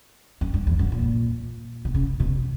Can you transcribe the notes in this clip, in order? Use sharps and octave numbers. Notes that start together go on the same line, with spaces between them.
F#2
G2
E2
F#2
A#2
B2
C#3
B2